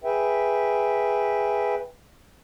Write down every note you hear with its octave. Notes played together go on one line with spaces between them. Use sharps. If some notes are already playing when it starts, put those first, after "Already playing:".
G#4 B4 E5 G5